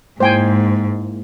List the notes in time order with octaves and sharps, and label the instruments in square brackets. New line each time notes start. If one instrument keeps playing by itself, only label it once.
[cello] G#2 [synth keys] G#3 A#3 E4 [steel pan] C5 G5 G#5